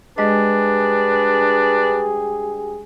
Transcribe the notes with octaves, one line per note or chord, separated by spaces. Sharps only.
G2 G#3 D4 G4 G#4 B4 D#5